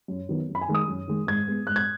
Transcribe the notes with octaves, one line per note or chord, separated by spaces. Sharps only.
F#2
D#3 F#3 B3
F#2
B5
G#5
D#3 G#3
D#6
F#2
D#3 G#3
G#2 G#6
G#3 B3
G#2 F#6
G#6